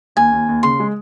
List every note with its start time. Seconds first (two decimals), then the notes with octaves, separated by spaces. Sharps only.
0.16 D#2 G#5
0.32 D#2
0.48 D#2
0.63 C#3 C6
0.80 G#3